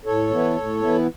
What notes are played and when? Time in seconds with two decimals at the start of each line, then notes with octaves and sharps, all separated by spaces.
0.05 A2 A4 C#5
0.31 E3 B3 E4
0.57 A2
0.82 E3 B3 E4